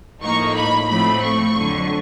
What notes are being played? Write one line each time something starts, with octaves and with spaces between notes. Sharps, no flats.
A2 F3 A#3 D#4 C#6
B5
A2 F3 A3 C4 B5
C#6
F2 D3 F#3